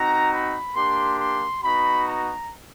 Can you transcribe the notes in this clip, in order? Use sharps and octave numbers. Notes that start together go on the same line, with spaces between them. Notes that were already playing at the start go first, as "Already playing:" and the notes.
Already playing: C4 D#4 F#4 A#5
B5
A#3 D4 G4 C6
C6
B3 D#4 F#4 B5
A#5